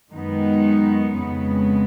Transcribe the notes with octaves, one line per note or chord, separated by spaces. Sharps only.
F#2 D#3 G#3 B3 D#4
F2 C#3 G#3 B3